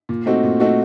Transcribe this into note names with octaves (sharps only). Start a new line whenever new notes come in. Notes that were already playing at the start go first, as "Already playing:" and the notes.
A#2
A3 C4 D#4 F#4
A#2
A3 C4 D#4 F#4